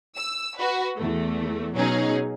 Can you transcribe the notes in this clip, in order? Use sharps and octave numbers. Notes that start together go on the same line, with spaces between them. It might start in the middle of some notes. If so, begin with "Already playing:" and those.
E6
F#4 B4
E2 A3
B2 F#3 C#4 D#4 G#4